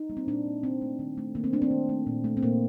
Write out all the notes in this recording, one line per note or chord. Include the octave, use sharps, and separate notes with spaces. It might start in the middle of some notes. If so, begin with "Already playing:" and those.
Already playing: D#4
G3 A#3
C4
A#2 D4
G3 A#3
D#3 C4
A3
D#3
A3
D#3 A#3
C4
A3 D4
C4
D#3
A3
A#2
A3
C4
A#2 A#3